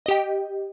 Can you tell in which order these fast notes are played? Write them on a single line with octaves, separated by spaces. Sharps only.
D#5 G4 G5